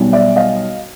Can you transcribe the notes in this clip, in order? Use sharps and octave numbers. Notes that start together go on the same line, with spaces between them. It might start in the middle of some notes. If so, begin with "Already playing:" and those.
Already playing: B1 B2 G3
D5 E5
D#5 F5